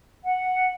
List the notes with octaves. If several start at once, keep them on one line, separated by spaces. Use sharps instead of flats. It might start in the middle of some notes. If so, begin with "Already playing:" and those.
F#5